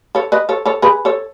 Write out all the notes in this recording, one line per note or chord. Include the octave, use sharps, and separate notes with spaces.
A4 C#5
B4 D#5
A4 C#5
A4 C#5
G#4 B4
A4 C#5